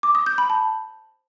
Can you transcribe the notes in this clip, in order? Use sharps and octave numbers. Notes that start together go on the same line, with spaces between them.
D6
D#6
G6
B5
A5